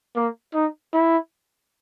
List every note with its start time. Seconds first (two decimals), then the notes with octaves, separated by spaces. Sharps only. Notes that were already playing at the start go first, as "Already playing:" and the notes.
0.16 A#3
0.54 D#4
0.93 E4